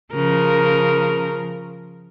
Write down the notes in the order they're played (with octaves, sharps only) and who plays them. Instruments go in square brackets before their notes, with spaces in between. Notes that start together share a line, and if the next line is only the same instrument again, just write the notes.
[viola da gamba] C#3 F3 A#4